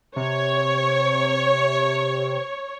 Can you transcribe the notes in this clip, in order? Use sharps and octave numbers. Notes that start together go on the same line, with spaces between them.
C3 C#5